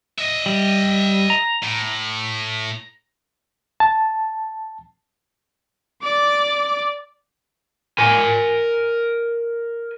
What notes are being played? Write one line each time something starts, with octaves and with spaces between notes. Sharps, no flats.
D#5 E5
G3
A#5
A2
A5
D5 D6
A#4 G#5